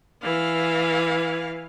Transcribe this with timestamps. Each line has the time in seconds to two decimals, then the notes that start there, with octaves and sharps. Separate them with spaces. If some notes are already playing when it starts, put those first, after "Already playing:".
0.23 E3 F5